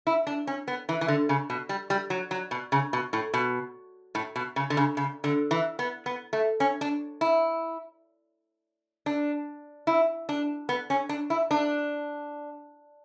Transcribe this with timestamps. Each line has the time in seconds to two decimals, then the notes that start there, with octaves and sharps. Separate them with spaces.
0.07 E4
0.27 D4
0.47 C#4
0.68 B3
0.89 E3
1.01 E3
1.08 D3
1.29 C#3
1.50 B2
1.69 G3
1.90 G3
2.10 F#3
2.31 F#3
2.51 B2
2.72 C#3
2.93 B2
3.13 A2
3.34 B2
4.15 A2
4.36 B2
4.56 C#3
4.70 D3
4.77 C#3
4.97 C#3
5.24 D3
5.51 E3
5.79 B3
6.06 B3
6.33 A3
6.60 C#4
6.81 D4
7.21 E4
9.06 D4
9.87 E4
10.29 D4
10.69 B3
10.90 C#4
11.09 D4
11.30 E4
11.51 D4